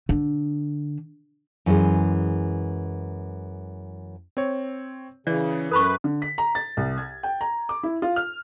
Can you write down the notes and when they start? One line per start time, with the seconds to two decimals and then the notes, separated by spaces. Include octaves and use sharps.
0.09 D3
1.66 F#2 E3 G#3 G#4
4.37 C4 C#5
5.27 C#3 E3 D5
5.71 F#2 A4 B4 B5 C#6
6.04 D3
6.22 B6
6.38 A#5
6.55 A6
6.77 C2
6.98 G#6
7.23 G5
7.41 A#5
7.69 D6
7.83 E4
8.02 F4
8.16 F6